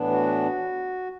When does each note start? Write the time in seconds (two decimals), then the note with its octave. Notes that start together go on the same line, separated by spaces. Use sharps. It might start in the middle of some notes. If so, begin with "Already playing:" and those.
Already playing: A2 E3 B3 D4
0.10 F#4